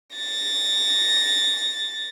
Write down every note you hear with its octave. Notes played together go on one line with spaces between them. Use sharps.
A6 A#6